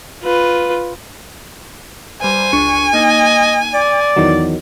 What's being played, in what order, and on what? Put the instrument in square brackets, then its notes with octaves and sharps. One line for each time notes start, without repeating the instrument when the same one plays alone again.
[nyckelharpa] F4 B4
[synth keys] G2 G3 A#5 [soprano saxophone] C5 [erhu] G#5
[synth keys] C#2 D4 C#7 [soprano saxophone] C#6
[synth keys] A#3 D#4 [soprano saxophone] D#5
[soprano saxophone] D5 [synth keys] D6
[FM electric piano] E2 D#3 F#3